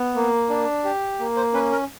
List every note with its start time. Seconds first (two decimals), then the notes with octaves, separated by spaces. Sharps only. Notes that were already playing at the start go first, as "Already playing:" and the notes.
Already playing: B3
0.15 A#3
0.49 D4
0.84 G4
1.20 A#3
1.37 C5
1.54 C#4 B4
1.72 A#4